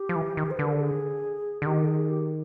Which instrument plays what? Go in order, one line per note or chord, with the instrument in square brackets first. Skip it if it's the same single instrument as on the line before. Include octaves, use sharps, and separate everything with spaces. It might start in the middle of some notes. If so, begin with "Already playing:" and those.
Already playing: [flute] G4
[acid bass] F3
E3
D#3
[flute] C5
[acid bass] D3 [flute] B4
[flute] A#4
A4
G#4
[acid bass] D3
[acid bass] D#3 [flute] G4
[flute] A4
G#4
G4